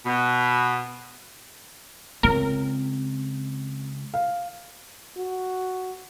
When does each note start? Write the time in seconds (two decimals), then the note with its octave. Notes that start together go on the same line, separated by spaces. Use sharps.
0.06 B2
2.23 C#2 C4 A#4
4.14 F5
5.18 F#4